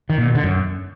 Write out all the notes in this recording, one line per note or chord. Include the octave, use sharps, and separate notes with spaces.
D#3
A#2
B2
D3
F#2